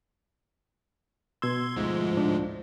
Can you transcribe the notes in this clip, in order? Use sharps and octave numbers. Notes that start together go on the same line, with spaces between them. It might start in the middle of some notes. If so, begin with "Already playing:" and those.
B2 C6 E6 G#6
D2 G#2 F3 G#3
A2 D4